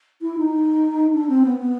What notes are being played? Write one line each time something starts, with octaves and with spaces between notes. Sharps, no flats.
E4
D#4
D4
C4
B3
B3